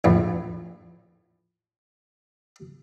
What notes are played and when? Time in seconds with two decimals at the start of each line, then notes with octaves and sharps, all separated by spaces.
0.04 A#1 E2 A2